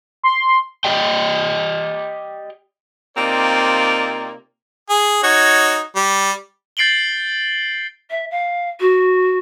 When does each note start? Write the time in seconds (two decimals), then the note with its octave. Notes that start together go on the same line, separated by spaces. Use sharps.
0.24 C6
0.84 G4 D5 D#5 G5
3.17 C3 A#3 C4 D#4 F4 D5
4.89 G#4
5.23 D#4 F#4 C#5
5.96 G3
6.77 G6 A6 C7 D7 F#7 G7
8.10 E5
8.31 F5
8.80 F#4